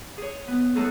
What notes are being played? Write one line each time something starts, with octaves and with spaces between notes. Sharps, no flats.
G#4 C#5
B3
F#3 A3 D#4 G#4 A4